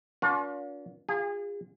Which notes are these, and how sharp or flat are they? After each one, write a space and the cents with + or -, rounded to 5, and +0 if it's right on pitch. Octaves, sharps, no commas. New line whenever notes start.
D4 -40 F4 +40 A#4 +45
F4 +5 G#4 -35